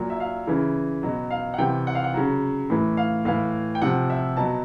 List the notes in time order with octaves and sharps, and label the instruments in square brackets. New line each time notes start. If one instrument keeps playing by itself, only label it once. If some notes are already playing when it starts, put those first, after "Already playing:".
Already playing: [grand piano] A#2 F#3
E5
F5
C#3 E3
B2 F#3
F5
F#5
C3 E3 G5
F#5
F5
F#5
C#3 F#3
A2 E3
F5
A2 E3 F5
G5
C3 F3 F#5
E5
B2 F#3 A5